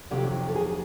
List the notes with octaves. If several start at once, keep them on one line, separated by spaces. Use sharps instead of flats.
F2 C3 D#3 F#3 G4
A4
G#4